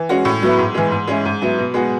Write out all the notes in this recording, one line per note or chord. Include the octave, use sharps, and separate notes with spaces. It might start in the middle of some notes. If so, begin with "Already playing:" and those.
Already playing: E3
G#3 C#4 F#4
A2
F#3 B3 E4
G#2
E3 G#3
G#2
G#3 C#4 E4
G#2
F#3 B3 E4
B2
G#3 B3 F#4